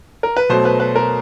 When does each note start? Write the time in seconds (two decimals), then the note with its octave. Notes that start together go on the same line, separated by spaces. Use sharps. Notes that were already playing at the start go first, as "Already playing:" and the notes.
0.23 A#4
0.37 B4
0.49 B2 F#3 A3 C5
0.65 B4
0.80 B4
0.96 A#4